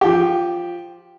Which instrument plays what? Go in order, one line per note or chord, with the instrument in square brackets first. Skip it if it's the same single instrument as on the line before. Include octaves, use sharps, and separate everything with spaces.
[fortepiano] F3 G4